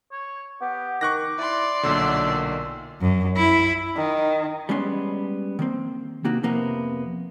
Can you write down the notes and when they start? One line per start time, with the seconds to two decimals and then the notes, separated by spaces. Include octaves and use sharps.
0.12 C#5
0.61 B3 G4
1.01 D#3 C#6 D6 F#6 A#6
1.38 E4 D5 C6
1.83 B1 A#2 D3 F#3 E5
2.27 D#3
3.02 F#2
3.37 E4
3.96 D#3
4.69 G3 G#3 B3 C#4 C6
5.59 D#3 A#3 C4
6.24 C3 A#3 D#4 F#4 G4
6.43 F2 C3 A#3 B3